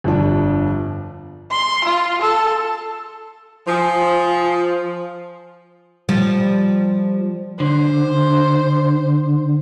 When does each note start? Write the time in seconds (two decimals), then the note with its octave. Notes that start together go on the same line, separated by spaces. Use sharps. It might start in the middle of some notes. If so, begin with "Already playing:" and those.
0.04 G1 F2 F3 D4
1.51 C6
1.85 F4
2.21 A4
3.67 F3 F4 G#5 D#6
6.09 F3 G3
7.60 D3 C5